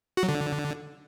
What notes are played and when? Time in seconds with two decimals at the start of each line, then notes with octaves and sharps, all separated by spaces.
0.17 F#4
0.23 F#3
0.29 D3